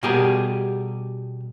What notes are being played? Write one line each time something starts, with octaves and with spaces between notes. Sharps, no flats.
B2 G3 G4 G#4 A#4